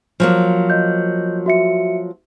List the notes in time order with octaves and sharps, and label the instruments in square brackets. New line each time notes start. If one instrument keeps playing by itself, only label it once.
[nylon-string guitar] F3 F#3 A#3
[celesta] D#5 G6
F#4 E5 C#7